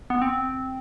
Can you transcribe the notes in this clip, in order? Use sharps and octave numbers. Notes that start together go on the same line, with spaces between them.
B3
C4